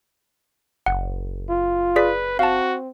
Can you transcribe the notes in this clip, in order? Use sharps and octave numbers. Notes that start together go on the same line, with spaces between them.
F#1 F#5
F4
G#4 B4 D5 B6
C4 F#4 F5 A5